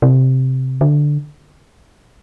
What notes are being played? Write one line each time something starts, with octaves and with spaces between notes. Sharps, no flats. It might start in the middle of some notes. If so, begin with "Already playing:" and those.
C3
D3